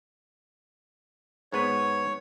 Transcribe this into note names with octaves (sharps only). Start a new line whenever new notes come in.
G#2 B3 B4 C#5